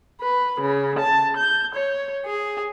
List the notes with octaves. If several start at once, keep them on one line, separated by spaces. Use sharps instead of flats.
B4
C#3
A5
G6
C#5
G#4